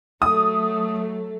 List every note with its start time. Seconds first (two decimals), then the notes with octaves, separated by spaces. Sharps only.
0.22 F#3 A3 D#6